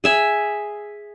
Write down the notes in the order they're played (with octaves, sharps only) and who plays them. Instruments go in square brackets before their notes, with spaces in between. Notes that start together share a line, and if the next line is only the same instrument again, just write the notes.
[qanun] G#4 E5 G#5